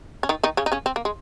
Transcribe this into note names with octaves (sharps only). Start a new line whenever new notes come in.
C#4
D#3 D#4
D#3 D#4
C#3 C#4
D#4
C#3 C#4
C4
A#3
G#3